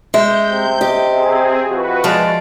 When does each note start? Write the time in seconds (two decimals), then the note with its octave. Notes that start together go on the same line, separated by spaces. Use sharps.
0.14 G#3 E5 G6
0.50 C3
0.81 G4 D#5
1.15 C4 G#4
1.69 F2 F#4 B4
2.04 F3 G#3 D5